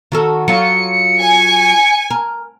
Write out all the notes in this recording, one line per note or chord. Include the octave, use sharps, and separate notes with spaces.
D#3 F#4 A4
F#3 F4 C#7
G#5
A#4